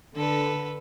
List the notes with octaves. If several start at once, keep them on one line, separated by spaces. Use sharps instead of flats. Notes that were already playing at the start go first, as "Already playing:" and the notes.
D3 A4 B4